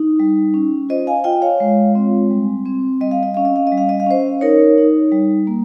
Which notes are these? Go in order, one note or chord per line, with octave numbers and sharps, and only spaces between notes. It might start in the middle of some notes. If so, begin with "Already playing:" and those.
Already playing: D#4
G3
C#4
F4 C5 D#5
F5 G#5
F4 D#5 G5
C#5 F5
G#3
C4
G3
C4
G3 D#5
F5
D#5
C#4 F5
D#5
F5
D#5
G3
F5
D#5
F5
C#4 C5 D#5
D#4 A#4 C#5
D#4
G3
A#3